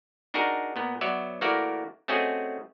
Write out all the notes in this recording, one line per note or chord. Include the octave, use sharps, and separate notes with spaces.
D4 D#4 F#4 G#4 A#4
A#2 B3
F#3 B3 C#5 D5 E5
E3 A3 A#3 F#4 A#4 D5
A3 C4 C#4 F#4 G#4 D#5